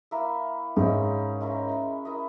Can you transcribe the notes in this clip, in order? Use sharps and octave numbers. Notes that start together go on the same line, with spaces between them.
A#3 E4 A#4 E5
G#2 G#3 C#4 E4 A#4
G#3 C#4 E4 A#4
E4 A#4 D#5